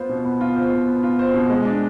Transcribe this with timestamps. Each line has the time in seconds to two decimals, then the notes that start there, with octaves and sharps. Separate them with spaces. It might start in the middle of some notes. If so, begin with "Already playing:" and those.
Already playing: B3 F4 C5
0.09 B2
0.25 B3
0.41 F4
0.56 C5
0.72 B2
0.88 B3
1.03 F4
1.19 C5
1.34 B2
1.50 G#3
1.65 D4